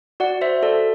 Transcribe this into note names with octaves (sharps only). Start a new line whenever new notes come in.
F#4 D5 F#5
C5 E5
A4 D5